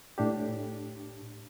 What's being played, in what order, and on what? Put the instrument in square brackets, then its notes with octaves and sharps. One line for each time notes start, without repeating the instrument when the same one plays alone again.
[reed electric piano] A2 D4 G4